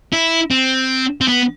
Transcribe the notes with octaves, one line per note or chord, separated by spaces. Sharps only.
E4
C4
C4
B3